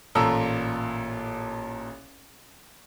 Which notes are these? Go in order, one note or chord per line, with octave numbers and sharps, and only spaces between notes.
A1 A#2 A4 A#5 E6